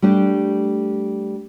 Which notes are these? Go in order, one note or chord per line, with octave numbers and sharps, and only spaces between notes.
G3 A3 D4 G4